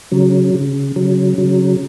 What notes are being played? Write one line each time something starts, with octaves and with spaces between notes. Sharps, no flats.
C#3 F#3
C#3
C#3 F#3
C#3 F#3